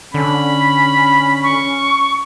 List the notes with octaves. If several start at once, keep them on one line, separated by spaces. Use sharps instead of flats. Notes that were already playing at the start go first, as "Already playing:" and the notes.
D3 C#4 B5
C#6